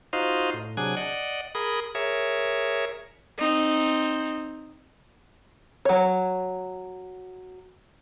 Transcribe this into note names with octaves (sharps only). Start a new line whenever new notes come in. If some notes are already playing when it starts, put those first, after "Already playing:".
D#4 F4 F#4 C5 D#5 F5
A2
C3 F#3 D4 G#4 G#5 F#6
D5 D#5 F#5
G#4 A#4 B5 D#6
G#4 A#4 C#5 E5
C4 D#4
F#3 C#5